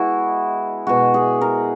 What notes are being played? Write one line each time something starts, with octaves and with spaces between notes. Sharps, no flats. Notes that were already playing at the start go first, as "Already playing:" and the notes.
Already playing: B2 G#3 E4 F#4 G#4
B2 G#3 F#4
G#4
A#4